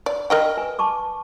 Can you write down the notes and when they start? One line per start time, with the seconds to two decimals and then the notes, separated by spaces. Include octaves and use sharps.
0.06 D5
0.30 A#4 D#5 G5
0.57 B4 G#5
0.79 A5 C#6 D6